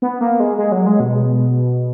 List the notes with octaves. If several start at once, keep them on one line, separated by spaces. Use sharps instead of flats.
B3
A#3
G#3
G#3
F#3
G#3
B2